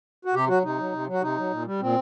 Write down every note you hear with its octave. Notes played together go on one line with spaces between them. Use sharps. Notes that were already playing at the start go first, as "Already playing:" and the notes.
F#4
C3 G4
F#3 F#4
C3 D#4
F#3
C3
F#3
F#4
C3 D#4
F#3
A#2
G3
A#2 C4